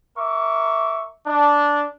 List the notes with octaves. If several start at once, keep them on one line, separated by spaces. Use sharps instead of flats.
A#4 E5 C#6 D6
D4